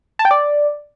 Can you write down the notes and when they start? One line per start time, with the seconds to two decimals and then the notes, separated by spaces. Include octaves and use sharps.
0.19 A5
0.25 G5
0.31 D5